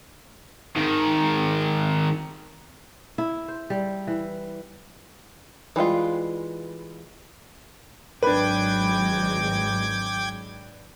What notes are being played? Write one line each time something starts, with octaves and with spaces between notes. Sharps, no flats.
G#2 D#3
E4
C5
G3
E3
E3 G3 G#3 F4
G#1 F#3 G#3 D4 B4 G5 D6 G#6